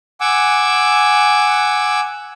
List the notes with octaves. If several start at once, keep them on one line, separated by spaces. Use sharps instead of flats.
F#5 G#5 D6 E6